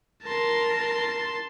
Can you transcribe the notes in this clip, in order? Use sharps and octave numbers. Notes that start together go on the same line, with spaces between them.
A#4 A5 C6